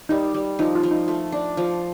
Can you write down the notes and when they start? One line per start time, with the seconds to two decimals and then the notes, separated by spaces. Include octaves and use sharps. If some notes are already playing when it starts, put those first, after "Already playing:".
0.09 G3 D#4
0.34 G3
0.59 F3 D#4
0.75 F4
0.83 F3
0.91 D#4
1.08 A3 F4
1.32 D4
1.57 F3